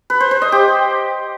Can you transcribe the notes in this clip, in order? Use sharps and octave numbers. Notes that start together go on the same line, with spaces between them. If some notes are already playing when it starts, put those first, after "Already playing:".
B4
C5
C5
D#5
G4